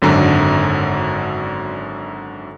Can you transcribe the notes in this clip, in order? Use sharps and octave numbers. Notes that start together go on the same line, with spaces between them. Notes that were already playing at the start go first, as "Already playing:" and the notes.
G#1 F#2 D3 A#5